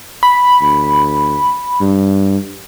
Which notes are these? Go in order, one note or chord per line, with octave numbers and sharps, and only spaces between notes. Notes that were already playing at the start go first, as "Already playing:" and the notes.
B5
D2
G2